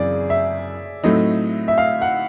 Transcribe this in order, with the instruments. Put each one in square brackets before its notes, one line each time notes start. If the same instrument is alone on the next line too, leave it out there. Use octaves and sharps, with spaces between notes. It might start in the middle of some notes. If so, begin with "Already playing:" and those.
Already playing: [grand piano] F#2 C#3 E3 C4 [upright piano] G#4 D5
[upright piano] E5
[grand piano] A2 F#3 A3 C4 D#4
[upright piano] E5
F5
F#5